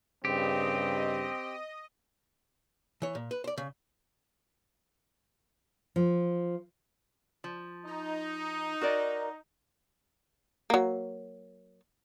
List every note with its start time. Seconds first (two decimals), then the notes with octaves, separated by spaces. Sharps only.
0.25 G2 C#3 C4 G4 D#5
3.02 E3 C#5
3.15 A#2
3.31 B4
3.44 C5 D5
3.58 C#3
5.96 F3
7.44 F3
7.85 D#4
8.81 F#4 A#4 D5
10.70 F#3 A#3